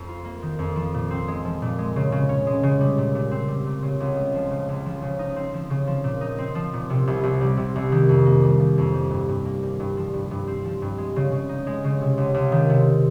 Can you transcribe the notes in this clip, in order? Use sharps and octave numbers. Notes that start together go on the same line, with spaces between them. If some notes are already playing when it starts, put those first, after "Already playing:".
Already playing: F2
F4
A#3
D#3
F2
F3
A#2
C4
G#3
F3
A#2
G#3
C#3
C#3
C#4
G#3
C#3
G3
A#2
A#2
C4
G3
A#2
C#3
C#2
G#3
F3
C#3
C#2
F3
C#3
D#4
C4
F3
C#3
F3
A#2
D#4
C4
F3
A#2
C3
C2
C2
G3
C3
C2
D#3
F2
A#3
G3
D#3
F2
G3
G2
G2
A#3
G3
G2
F3
G2
G2
C4
F3
G2
G#3
C#3
C#3
D#4
G#3
C#3
C3
C#2
C#2
D#3
C3